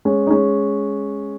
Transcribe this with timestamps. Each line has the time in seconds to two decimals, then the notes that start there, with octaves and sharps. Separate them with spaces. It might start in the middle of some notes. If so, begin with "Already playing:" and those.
0.05 G#3 C#4
0.27 D#4
0.31 G#3 C#4